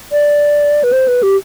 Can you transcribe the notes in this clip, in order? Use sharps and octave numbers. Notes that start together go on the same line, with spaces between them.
D5
B4
C5
B4
G4